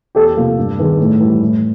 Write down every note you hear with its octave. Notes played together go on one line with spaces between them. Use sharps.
E2 G4 A4
C3 F3 A#3
G2
D#3 G#3 B3
A2
E3 G3
A2